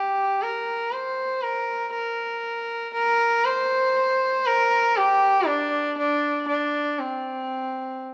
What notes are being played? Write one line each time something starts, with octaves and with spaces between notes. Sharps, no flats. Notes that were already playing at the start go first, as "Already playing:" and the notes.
Already playing: G4
A#4
C5
A#4
A#4
A#4
C5
A#4
G4
D4
D4
D4
C4